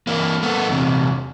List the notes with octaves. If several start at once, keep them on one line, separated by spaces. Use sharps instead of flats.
E3 A#3
A3 B3
E2 C3